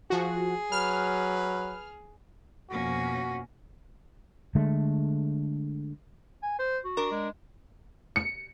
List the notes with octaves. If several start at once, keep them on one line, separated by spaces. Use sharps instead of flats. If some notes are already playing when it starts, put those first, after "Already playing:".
F3 F#4 G#4
F#3 B4 F6
F2 B2 F3 A#3 C#4 F#4
D3 G#3 A3
G#5
C5
F#4
D4 A#4
G#3
C#7